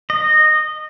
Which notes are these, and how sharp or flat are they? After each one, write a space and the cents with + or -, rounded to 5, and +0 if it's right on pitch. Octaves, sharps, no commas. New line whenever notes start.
D#5 -15